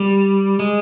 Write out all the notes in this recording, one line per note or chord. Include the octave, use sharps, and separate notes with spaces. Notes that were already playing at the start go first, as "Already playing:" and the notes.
Already playing: G3
G#3